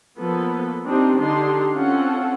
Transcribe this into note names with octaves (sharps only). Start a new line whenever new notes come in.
F3 A#3 B3 A4 B4
C4 D4 D#4 G4 C5
D3 D4 D#4 G4 C6
C4 C#4 F4 A4 F#5